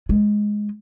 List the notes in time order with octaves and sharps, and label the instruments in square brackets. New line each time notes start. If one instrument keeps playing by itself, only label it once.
[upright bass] G#3